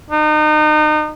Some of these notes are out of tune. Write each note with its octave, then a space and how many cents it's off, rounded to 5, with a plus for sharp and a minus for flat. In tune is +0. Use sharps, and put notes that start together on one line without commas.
D#4 -30